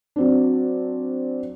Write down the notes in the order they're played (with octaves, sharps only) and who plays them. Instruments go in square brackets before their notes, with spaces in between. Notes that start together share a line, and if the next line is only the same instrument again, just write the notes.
[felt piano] F#3 C4 D4